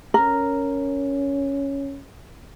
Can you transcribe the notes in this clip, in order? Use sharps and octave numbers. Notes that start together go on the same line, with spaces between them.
C#4 A#4